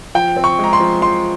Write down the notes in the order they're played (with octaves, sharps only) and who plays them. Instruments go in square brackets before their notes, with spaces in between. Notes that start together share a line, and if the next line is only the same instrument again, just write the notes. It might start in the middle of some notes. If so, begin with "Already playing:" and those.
[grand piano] F3 G5
C4
C#6
G#3 A#5
C6
F3
F3 C6